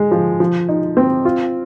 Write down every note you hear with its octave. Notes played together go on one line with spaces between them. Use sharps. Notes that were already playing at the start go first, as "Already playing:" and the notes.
Already playing: G#3
F3
F3
D#4
C4
F4